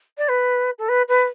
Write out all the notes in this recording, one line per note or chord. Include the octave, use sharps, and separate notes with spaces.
D5
B4
A4
B4
B4